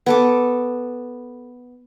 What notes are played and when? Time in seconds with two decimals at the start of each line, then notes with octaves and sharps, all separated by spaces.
0.06 B3 A4 D6